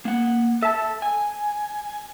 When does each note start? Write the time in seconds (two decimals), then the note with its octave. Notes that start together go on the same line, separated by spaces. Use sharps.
0.05 A#3 F#5
0.62 A4 E5 A5
1.02 G#5